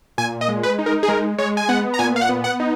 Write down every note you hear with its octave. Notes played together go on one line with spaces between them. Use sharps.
A#2 G#5
D#5
G#3
B4
D#4
A#4
G#4
G#3 A#4
G#3 C#5
G#5
B3 F#5
A#5
A#2 G#5
F5
F#5
B3
F#5
D#4